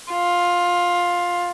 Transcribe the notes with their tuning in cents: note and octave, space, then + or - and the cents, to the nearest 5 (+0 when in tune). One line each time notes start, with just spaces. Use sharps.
F4 +10